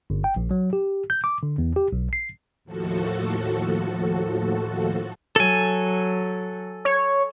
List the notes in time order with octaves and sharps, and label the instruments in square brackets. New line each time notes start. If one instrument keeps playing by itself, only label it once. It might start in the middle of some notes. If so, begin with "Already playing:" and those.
[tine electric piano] G1
G5
A#1
F#3
G4
G6
D6
D3
E2
G4
B1
C7
[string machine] D#2 A2 F3 F#4 A4
[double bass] F#3 [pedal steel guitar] A4 G#5
[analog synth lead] C#5